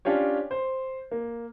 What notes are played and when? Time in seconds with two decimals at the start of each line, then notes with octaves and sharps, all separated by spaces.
0.05 C#4 D4 F4 G4 C#5
0.51 C5
1.11 A#3